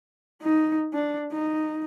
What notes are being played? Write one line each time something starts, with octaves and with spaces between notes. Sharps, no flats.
D#4
D4
D#4